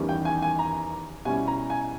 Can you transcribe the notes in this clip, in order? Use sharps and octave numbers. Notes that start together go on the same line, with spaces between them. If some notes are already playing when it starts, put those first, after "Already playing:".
Already playing: E2 D#3 G3 C#4
G5
G#5
G#5
A#5
B2 G3 C#4 E4 G#5
A#5
G#5